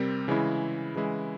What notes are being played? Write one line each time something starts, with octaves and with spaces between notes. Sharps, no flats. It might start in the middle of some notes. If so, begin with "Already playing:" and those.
Already playing: C3 G3 C4 G4 A#4
C#3 E3 G#3 E4
C#3 E3 G#3 E4